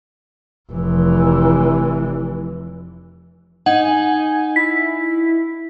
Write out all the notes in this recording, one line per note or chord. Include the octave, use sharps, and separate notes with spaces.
F1 E3
D#4 F#5 G#5
E4 B6